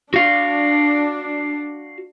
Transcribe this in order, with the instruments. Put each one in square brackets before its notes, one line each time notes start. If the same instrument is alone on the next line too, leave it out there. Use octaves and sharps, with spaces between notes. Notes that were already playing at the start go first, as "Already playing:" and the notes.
[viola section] D4 [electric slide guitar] F#4 F5